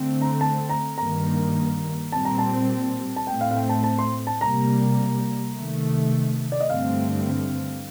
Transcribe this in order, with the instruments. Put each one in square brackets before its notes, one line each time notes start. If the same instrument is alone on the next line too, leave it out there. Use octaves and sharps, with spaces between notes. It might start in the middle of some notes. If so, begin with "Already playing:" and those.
Already playing: [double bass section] D3 A3 C4
[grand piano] A#5
A5
A#5
[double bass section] G2 D#3 A#3 [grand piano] A#5
[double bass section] A#2 G3 C4 [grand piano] A5
[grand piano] A#5
A5
A5
[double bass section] A2 A3 C4 [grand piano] G5
[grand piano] F5
F5
G5
A5
A5
C6
A5
[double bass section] C3 G3 A#3 [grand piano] A#5
[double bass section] C3 D#3 A3
[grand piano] D5
D#5
[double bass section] G2 D3 A3 C4 [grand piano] F5